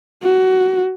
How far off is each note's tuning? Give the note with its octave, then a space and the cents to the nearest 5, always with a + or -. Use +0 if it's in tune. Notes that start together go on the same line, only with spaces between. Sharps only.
F#4 +15